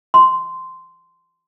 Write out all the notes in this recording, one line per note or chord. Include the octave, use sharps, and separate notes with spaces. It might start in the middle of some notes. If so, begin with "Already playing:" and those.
C6